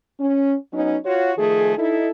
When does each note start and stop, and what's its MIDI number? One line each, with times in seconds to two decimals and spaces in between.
0.19 0.55 61
0.72 0.96 54
0.72 0.96 59
0.72 0.96 61
0.72 0.96 63
1.05 1.32 65
1.05 1.32 66
1.05 1.32 73
1.37 1.76 51
1.37 1.76 53
1.37 1.76 57
1.37 1.76 68
1.77 2.09 63
1.77 2.09 64
1.77 2.09 69